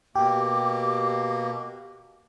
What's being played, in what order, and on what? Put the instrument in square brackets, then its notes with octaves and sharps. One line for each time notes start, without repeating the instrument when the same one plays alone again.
[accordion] B2 A#3 [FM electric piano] G4 [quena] D6